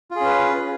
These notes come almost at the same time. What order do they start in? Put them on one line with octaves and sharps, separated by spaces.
F4 G#4 C#4 B4